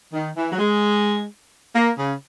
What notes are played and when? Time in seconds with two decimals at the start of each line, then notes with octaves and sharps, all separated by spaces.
0.13 D#3
0.37 E3
0.52 F#3
0.59 G#3
1.74 A#3
1.97 C#3